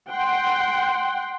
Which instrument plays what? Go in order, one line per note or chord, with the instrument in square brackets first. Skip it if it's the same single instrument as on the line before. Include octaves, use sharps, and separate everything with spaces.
[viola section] F#5 G5 C6